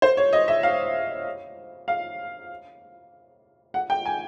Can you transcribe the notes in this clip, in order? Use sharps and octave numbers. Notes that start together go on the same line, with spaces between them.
C5
C#5
D#5
E5
F5
F5
F#5
G5
G#5